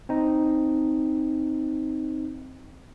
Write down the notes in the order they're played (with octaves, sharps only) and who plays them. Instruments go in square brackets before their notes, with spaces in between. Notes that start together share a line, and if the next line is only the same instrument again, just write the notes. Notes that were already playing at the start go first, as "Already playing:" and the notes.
[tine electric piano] C4 D#4